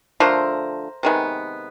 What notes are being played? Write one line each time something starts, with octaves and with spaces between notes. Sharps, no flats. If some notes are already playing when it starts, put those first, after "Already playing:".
D3 F3 A3 A#4 C5
C3 D#3 G#3 B3